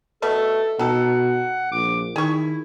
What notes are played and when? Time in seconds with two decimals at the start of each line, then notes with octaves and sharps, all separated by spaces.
0.22 B2 A3 A4 D#5
0.79 B2 D#4 A4 F#5
1.72 A#1 D6
2.16 D#3 E4 G#4 C#6